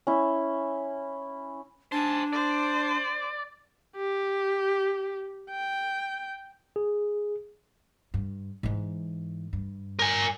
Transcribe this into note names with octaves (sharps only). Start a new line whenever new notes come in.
C#4 E4
D4 C5 G#5 A5
C5 D5
G4
G5
G#4
G2
G#2 E3
G2
A#4 G#5